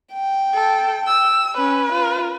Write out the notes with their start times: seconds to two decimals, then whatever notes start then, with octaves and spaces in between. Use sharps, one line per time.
0.14 G5
0.54 A4
1.07 E6
1.57 C#4 B4
1.92 F4